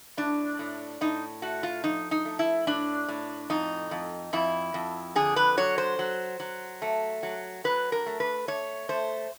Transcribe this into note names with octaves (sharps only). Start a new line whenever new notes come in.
A2 D4
A2
A2 D#4
A3 F#4
F4
F3 D#4
D#4
A3
E4
A2 D4
A2
F2 D#4
F2
F2 E4
F2
D3 G#4
B4
F#3 C#5
C5
F#3
F#3
A3
F#3
F#3 B4
A#4
A3
B4
A3 C#5
A3 C5